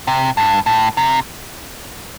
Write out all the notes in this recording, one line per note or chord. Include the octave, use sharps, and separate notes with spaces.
C3
G2
A2
C3